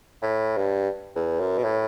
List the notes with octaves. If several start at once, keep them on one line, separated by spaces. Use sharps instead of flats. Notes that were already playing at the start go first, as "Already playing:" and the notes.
A2
G2
E2
F#2
B2
A2